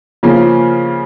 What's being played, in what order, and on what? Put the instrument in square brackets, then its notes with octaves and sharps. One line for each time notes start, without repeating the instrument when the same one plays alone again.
[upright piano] C#3 F3 A#3